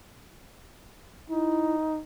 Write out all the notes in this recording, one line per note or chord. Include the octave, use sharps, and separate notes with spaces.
D#4 E4